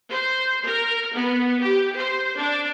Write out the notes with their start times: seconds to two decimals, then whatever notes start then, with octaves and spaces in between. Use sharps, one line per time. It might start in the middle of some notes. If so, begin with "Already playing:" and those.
0.12 C5
0.66 A#4
1.14 B3
1.62 G4
1.97 C5
2.37 D4